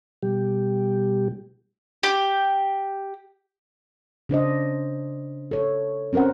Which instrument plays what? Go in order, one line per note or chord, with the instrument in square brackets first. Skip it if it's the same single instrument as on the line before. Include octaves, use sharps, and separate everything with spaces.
[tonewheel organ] B2 G3 G4
[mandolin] G4
[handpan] C#3 D4 C5 D#5
A4 C#5
C4 C#4 A#4 C5 F#5